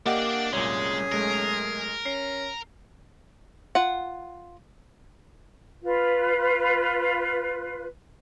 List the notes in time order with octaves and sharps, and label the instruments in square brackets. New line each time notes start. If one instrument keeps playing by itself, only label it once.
[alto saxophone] A#3 [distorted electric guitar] D4 D5 [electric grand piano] G4 D#5 F#5
[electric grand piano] C2 F#2 A#2 [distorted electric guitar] G#3 [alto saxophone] C#4 [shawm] G#4
[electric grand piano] B1 G#3 A3 [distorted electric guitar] A#4
[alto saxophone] C#4 [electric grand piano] C7
[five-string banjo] F4 F#5
[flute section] F4 B4